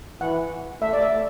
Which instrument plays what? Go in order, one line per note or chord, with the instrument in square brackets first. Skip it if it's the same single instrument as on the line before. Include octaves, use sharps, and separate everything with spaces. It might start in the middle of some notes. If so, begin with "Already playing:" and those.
[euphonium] E3 [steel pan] F#5
[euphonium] A3 [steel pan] E5
[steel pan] D5
E5